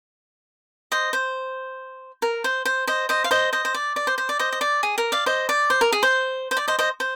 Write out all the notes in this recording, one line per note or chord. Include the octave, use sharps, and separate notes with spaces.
C5 D#5
C5
A#4
C5
C5
C5 D#5
C5 D#5
F5
C5 D#5
C5 D#5
C5
D5
D5
C5
C5
D5
C5 D#5
D#5
D5
G#4
A#4
D5 F5
C5 D#5
D5
C5
A#4
G#4
C5
C5
D5
C5 D#5
C5 D#5
C5